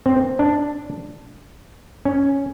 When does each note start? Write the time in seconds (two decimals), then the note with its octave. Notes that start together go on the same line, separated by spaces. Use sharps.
0.06 C4
0.39 D4
2.05 C#4